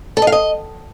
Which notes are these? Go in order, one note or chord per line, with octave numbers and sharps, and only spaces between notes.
A4
D#5
F5
D#5